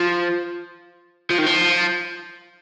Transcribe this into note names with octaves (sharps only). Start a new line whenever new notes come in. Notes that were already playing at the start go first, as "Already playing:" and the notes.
Already playing: F3
F3
D#3
F3